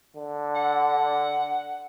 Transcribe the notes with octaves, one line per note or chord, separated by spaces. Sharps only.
D3
F#5